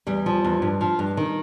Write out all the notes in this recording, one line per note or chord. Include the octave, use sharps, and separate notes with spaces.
E2 G3
F3
E2
G2
F3
G2
D#3